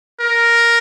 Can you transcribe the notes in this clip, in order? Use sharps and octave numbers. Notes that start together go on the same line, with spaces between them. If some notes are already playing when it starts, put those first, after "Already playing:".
A#4